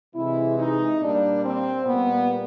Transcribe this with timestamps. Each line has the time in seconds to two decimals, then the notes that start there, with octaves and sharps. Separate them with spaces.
0.15 C3 E3 G#3 E4
0.57 D#4
1.01 A#2 G3 A#3 D4
1.43 C4
1.86 A#2 G3 A#3 B3